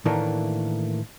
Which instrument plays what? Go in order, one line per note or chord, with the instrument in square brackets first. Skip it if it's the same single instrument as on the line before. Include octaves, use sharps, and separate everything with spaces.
[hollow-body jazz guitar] A2 D#3 E3 A3 A#3 D4